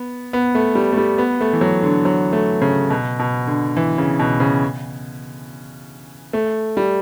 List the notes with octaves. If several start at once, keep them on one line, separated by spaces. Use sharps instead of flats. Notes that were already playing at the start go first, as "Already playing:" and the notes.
Already playing: B3
B3
A3
G3
A3
G3
B3
A3
E3
F#3
D3
F#3
A3
C#3
B2
B2
D3
E3
C#3
B2
C#3
A3
G3